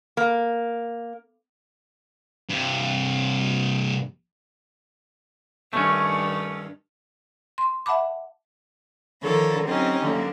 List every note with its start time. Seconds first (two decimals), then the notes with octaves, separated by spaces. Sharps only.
0.17 A#3
2.49 G2 C3
5.73 G2 D#3 A3 C#4
7.58 C6
7.86 E5 F#5 A5 B5 D6
9.23 D3 D#3 F3 A4 A#4 C#5
9.66 F#3 C4 C#4 D#4 G4
10.02 D3 F#3 A#3